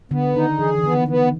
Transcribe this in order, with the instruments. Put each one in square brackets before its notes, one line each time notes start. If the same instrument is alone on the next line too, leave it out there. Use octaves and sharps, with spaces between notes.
[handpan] D3 [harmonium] B3
[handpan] D#3 [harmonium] D#4
[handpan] E3 [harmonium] G#4
[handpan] E3
[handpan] D#3 [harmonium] B3
[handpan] D3 [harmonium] B3